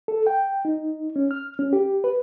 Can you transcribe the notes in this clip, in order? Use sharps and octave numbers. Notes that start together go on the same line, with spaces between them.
A4
G5
D#4
C#4
F6
C#4
G4
B4